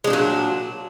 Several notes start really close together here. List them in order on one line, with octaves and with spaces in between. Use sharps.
G#3 D4 A#2 F#3